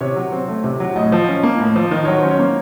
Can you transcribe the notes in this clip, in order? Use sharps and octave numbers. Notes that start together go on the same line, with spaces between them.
C3 C#5
F#3
C4
A3
C3
F#3
A2 D#5
F3
C#4
A#3
A2
F3
D#3 D#5
F#3 C#5
C5
C#4
C#5
A#3